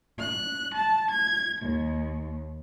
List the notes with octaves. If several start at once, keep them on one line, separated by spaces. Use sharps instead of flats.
F#6
A5
G#6
D#2